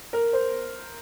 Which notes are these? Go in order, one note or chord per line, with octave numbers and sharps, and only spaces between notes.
A#4
C5